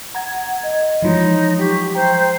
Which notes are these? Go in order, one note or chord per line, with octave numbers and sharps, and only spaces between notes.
F#5 A#5 G#6
D#5
E3 F3 G#3 D#4 C#5
F#3 G4 C#6
C5 G5 A#5